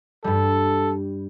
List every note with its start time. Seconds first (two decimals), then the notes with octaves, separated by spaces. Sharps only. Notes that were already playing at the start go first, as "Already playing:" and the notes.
0.24 G2 G3 A4